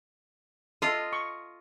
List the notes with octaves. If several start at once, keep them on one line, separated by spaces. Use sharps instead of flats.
F4 A4 D#5 F5
C#6